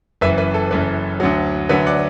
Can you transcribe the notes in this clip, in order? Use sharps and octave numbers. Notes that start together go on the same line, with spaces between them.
F#1 F#2 E3 B4 E5
B4
A4
F#1 F#2 E3 B4
D2 D3 F#3
D2 D3 F#3 B4 E5
D5 F#5